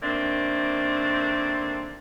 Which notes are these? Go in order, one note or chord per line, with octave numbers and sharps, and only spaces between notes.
D#3 A3 A#3 C4 D4